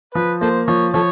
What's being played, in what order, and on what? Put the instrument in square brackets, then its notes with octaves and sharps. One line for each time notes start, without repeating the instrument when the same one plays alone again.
[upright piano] F3 [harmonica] B4
[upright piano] A#3 [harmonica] A4 C5
[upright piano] F3 [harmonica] C#5
[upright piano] F3 [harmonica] A4 C#5